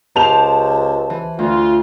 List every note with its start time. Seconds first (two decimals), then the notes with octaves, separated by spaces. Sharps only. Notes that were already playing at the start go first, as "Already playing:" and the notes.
0.16 C#2 G4 C5 A5 F7
1.10 E3
1.39 D2 F4